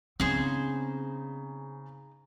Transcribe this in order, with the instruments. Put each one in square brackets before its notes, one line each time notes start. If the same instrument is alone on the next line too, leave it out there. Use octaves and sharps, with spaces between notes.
[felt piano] C#3 [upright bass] B3 C4 [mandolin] D#4 G#4 C5